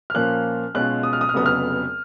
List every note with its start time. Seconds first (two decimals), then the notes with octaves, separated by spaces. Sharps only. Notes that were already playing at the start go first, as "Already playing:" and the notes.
0.10 F6
0.14 A#2 F3 A#3 C#4 F#6
0.75 B1 B2 G#3 C#4 F4 F#6
1.03 D#6
1.13 F6
1.21 D#6
1.29 F6
1.34 F1 F2 C#3 F#3 B3 D#6
1.46 F6